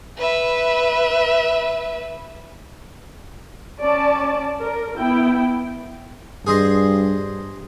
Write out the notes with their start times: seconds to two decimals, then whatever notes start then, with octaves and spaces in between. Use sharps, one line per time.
0.17 B4 E5
3.82 C#4 D5 A5
4.61 A#4
4.98 B3 E4 G5
6.47 G2 G#4 C5 D#5